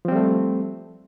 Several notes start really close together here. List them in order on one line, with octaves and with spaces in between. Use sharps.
F3 C4 G3 A3